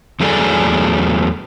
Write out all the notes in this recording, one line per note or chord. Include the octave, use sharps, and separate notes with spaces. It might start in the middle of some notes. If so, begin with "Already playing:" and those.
E2 F#3 A3 G#4 A4 D5